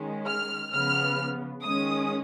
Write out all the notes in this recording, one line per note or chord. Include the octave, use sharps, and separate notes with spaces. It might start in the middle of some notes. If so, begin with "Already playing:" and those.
Already playing: D#3 G#3 C#4
F6
C#3 F3 B3 F6
D#3 G#3 C#4 D#6